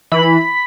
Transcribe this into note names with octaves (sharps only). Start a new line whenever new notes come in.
E3 B5